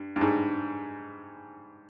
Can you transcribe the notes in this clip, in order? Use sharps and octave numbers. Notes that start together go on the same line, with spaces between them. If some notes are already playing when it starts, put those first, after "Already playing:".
Already playing: G2
G2
G#2